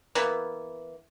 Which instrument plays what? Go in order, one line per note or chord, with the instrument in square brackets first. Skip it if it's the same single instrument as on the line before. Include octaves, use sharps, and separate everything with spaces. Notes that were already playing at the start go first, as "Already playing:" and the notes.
[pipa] E3 A#3 B3